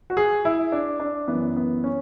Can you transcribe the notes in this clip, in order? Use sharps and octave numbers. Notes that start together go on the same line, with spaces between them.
F#4
G#4
E4
D4
D4
F#2 E3 B3
B3
C#4